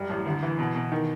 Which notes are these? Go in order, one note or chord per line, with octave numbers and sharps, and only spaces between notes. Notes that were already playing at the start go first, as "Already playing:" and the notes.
Already playing: F#2 G3
A1
D2
E3
B2
B2
D#3